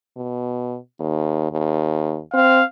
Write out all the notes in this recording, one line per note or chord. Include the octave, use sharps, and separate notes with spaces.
B2
D#2
D#2
C4 F5